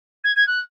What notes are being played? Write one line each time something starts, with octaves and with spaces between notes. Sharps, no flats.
G#6
G#6
F#6